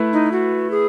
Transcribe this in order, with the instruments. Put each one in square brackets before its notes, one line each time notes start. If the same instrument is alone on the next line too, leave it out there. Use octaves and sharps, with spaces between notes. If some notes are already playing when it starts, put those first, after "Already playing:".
Already playing: [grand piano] A3 E4 B4
[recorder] D#4
F#4
G#4